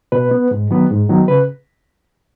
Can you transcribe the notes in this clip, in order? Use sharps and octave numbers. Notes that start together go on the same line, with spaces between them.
B2 B4
B3
G#2
D#3 F#3 B3
G#2
D#3 F#3 B3
C#3 B4